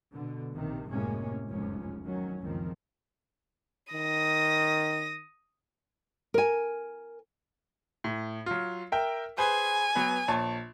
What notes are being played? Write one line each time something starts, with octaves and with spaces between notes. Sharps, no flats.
B2 D3
A#1 C3 D#3
F#1 A2 C3 G#3 A#3 C#4
F1 C#2 F#2 A2 F3 C#4
D#3 F#3 C#4
F#1 C#2 D#3 F3 C4
D#3 D#6 A#6
A#4 G#5
A2
F#3 F4
A#4 E5 G5
G#4 B4 C5 G#5
F#3 B3 B4
A#1 C#5 A5